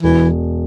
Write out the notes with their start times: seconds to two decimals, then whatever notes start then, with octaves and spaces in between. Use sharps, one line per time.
0.03 E1 E3